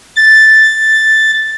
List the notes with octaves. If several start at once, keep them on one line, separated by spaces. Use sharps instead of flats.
A6